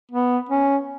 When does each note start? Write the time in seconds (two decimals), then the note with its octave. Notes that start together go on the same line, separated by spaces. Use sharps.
0.11 B3
0.49 C#4